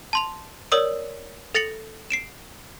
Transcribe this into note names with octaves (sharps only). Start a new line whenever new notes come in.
A5 C6 F7
A#4 C#5 D5 D#6 E6
A4 A6 A#6 C#7 F#7
C7 D7 E7